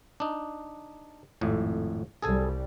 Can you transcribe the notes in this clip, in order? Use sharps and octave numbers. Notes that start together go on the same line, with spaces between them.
D4 D#4
G#1 F2 A2
C2 G3 G#4 A4 G#5